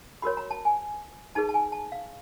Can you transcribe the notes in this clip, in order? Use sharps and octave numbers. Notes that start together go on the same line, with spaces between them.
F#4 A#4 C#5 B5
A#5
A5
G#5
D#4 G#4 B4 A5
A5
G#5
A5
F5